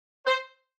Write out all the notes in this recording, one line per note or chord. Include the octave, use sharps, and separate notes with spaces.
C5